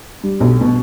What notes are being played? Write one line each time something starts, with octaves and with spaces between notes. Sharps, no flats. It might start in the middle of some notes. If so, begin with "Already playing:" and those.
G3
B1
B2